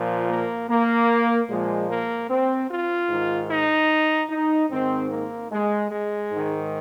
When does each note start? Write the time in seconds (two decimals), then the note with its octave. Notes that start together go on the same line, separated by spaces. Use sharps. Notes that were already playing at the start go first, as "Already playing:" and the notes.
Already playing: A#2 F3
0.29 A#3
0.69 A#3
1.49 A#2 F3 G#3
1.89 A#3
2.29 C4
2.70 F4
3.10 G#2 D#3
3.50 D#4
4.30 D#4
4.70 G#2 D#3 C4
5.10 A#3
5.51 G#3
5.91 G#3
6.31 G#2 D#3